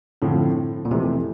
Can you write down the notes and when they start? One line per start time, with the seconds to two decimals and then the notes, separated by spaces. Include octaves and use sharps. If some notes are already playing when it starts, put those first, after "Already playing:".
0.22 A2 D3 F3 C4
0.85 A#2
0.90 F2 C3 E3 A3